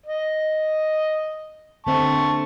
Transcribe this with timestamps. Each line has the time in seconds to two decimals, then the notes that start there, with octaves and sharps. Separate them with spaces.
0.06 D#5
1.87 D3 C4 A5 C#6